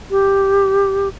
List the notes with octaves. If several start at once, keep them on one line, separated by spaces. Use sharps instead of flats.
G4